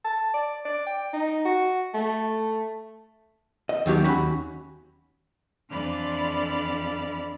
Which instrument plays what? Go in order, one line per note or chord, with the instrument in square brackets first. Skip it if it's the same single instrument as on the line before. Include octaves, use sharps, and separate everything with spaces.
[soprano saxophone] A5
D5
D5
G5
D#4
F#4
A3
[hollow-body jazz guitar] D#5
D#2 D#3 F#3 G4
D#2 C#4 F#4 B5
[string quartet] F2 E3 D4 D5 B5 F6